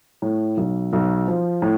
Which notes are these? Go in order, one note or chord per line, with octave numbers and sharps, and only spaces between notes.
A2
B1
B1
F3
A2